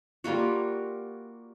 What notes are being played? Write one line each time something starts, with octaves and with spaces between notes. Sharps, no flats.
G3 A#3 F4 F#4